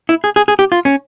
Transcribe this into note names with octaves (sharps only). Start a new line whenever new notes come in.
E4
G#4
G#4
G#4
G4
F4
C#4